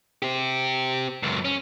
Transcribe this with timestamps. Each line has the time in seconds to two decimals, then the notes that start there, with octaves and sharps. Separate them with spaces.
0.22 C4 G4
1.23 C#2 F#2
1.45 C#4